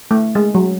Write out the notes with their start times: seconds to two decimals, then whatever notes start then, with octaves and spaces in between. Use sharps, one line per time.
0.11 A3
0.35 G#3
0.55 F#3